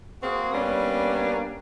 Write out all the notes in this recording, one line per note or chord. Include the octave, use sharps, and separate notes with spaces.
A#3 C4 F#4 G#4
G3 A#3 B3 C#4 D4